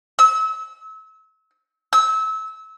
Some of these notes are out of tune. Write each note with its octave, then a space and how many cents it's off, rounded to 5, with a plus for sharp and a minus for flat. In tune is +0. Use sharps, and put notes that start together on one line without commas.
E6 -30
E6 -25